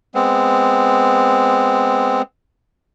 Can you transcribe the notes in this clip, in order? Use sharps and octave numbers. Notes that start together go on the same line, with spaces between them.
G#3 B3 C4